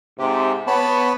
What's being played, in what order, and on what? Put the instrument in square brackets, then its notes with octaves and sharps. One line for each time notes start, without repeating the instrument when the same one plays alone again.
[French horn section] G#2 C3 [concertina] G4
[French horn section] B3 [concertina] C#5 A5 B5